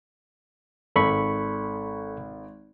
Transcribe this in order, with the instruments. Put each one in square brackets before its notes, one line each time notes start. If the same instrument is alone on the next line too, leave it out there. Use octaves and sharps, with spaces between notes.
[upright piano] G#1 [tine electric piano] A4 B5 C#6